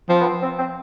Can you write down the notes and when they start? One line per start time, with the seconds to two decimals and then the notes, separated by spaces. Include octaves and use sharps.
0.09 F3 C4
0.21 B3
0.26 C4
0.42 C4
0.59 C4